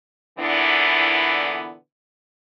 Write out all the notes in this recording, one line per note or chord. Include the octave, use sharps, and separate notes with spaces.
A#2 D3 E3 B3 D4 E4